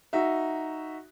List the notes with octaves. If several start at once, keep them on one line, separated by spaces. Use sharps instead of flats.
D#4 F#4 E5